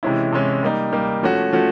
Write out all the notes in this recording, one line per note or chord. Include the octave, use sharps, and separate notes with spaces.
C3 E3 G#3 C#4 E4
C3 E3 G#3 C#4 E4
G3 A#3 D#4
G3 A#3 D#4
F3 A3 C#4 F#4
F3 A3 C#4 F#4